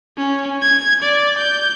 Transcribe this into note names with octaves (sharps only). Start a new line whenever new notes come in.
C#4
G#6
D5
G6